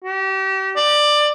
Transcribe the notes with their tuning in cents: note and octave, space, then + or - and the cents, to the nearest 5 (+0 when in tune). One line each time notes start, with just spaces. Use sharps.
G4 -35
D5 +15